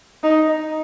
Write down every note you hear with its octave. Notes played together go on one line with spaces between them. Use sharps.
D#4